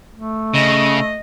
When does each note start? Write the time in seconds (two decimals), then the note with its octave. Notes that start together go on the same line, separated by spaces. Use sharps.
0.14 A3
0.54 C#3 D#5